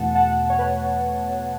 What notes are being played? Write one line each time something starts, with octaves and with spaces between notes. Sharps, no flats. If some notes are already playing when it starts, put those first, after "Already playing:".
Already playing: E2 B2 A3 F#5 A5
F#5 A5
C#5
B4